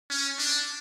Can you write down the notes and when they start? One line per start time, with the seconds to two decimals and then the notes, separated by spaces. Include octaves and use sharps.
0.10 C#4
0.39 D4